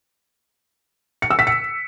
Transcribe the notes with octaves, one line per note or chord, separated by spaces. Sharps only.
C#7
E6
B6
C#7